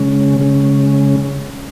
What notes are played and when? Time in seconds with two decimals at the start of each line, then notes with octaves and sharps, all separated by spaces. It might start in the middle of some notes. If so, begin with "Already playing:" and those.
Already playing: C#3 G#3 C#4
0.39 C#3 G#3 C#4